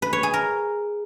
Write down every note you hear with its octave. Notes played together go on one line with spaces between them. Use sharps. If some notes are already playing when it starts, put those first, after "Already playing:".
B4
C#5
G#4
A#4